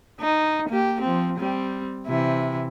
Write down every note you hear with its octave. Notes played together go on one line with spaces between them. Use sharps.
D#4
A#3 G4
F3 C4
G3 C4
C3 E3 E4